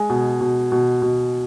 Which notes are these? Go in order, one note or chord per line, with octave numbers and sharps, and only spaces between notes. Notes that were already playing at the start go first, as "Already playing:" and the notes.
Already playing: G#3 G#5
B2
B2
B2
B2